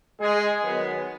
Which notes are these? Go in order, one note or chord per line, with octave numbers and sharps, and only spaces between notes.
G#3 G#4
D#3 F#3 B3